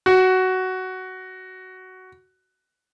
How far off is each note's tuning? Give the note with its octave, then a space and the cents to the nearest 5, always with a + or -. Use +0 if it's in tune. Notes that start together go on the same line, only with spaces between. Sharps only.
F#4 +10